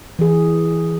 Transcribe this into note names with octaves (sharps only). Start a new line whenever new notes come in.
E3 G#4